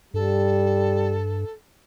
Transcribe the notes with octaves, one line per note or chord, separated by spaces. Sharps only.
G2 G3 A4